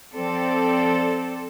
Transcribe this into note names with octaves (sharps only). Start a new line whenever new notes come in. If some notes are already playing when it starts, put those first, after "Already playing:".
F3 C4 A4 D5